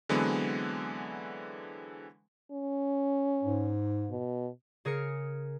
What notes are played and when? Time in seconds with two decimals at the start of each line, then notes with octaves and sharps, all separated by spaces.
0.09 D3 E3 F#3 G#3 B3 C4
2.51 C#4
3.43 G#2
4.10 B2
4.85 C#3 G#4 A#4 F6 C#7